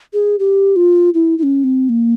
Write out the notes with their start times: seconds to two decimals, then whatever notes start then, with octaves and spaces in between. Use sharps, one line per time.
0.13 G#4
0.39 G4
0.76 F4
1.14 E4
1.38 E4
1.43 C#4
1.64 C4
1.89 A#3